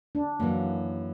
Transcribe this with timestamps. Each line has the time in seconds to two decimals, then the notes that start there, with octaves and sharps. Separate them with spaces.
0.15 D4
0.40 F#2 E3 F#3 A#3